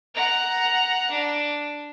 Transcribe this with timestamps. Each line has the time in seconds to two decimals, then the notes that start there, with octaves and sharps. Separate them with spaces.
0.14 F#5 A#5
1.11 D4